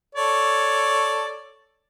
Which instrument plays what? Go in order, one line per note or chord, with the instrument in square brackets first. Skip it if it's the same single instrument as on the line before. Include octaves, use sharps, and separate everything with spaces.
[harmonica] A4 C#5 D5